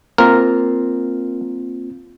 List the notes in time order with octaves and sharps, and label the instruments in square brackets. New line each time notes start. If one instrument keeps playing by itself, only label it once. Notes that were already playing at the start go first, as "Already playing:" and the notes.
[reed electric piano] A#3 C4 F4 [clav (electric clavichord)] A#4